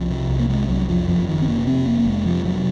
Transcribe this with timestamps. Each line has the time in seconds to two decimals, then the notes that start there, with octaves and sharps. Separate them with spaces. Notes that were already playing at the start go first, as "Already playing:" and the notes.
Already playing: C2 F3
0.10 C3
0.29 C2
0.39 A#3
0.49 C3 G#3
0.69 C2 F#3
0.89 F2 F3
1.07 F#1 F3
1.27 F#1 D#3
1.42 C4
1.48 C3 A#3
1.66 F2 C4
1.86 F1 A#3
1.99 A#3
2.06 F1 G#3
2.25 C3 F3
2.45 C3 F#3